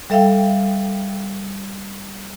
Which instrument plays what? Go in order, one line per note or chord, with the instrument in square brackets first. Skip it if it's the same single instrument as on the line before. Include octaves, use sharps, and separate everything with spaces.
[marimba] G3 A4 E5 F5 G5